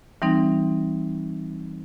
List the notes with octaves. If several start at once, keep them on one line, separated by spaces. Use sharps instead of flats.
E3 G3 C4 D#4